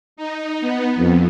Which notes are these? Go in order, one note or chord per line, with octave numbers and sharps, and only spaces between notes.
D#4
B3
F2